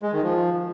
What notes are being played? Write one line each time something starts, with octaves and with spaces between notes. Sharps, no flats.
G#3
D#3
F3